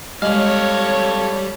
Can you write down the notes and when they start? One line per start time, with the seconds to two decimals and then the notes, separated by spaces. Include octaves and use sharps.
0.22 G3 G#3 A4 C#5 D#5 F5